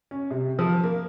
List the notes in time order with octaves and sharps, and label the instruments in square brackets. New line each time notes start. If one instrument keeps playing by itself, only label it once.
[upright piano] C#4
C3
F3
A#3